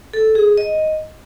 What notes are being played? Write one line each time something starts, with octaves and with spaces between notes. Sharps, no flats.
A4
G#4
D#5